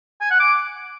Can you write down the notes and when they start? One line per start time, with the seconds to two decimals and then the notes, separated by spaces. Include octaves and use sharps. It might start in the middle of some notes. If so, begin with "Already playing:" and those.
0.21 G#5
0.30 F#5
0.40 D6